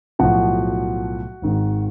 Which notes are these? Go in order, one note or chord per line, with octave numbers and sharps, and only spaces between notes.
B1 A2 F3 F#4 F#5
G#1 G#2 D#3